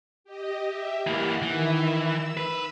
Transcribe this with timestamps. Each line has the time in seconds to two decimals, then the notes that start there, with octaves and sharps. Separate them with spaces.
0.24 G4 D#5
0.63 G4 E5
1.07 E3 A#3 F#5
1.43 D#3 E3 E5
2.00 E6
2.37 B4